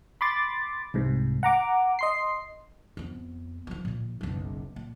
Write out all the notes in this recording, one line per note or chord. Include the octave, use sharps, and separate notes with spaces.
B5 C6 D6 A6
C2 G#2 C3
F#5 A#5 D6
D#5 C6 C7
F2 B3
D#3 F3
A#2 F3
F#1 B1
A#2